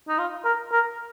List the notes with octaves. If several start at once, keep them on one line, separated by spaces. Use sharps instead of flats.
D#4
F4
A#4
A#4